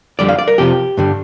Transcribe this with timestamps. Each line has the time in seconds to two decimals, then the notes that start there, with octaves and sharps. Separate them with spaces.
0.19 F2 D3 G3 D5
0.29 F5
0.39 D5
0.48 A#4
0.58 F2 C3 F3 G4
0.97 G2 D3 G3